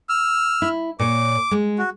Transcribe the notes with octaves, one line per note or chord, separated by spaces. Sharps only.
E6 F6
E4
A#2 C#5 D6
G#3
F#4